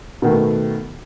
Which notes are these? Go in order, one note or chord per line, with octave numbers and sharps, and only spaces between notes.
B2 D#3 A3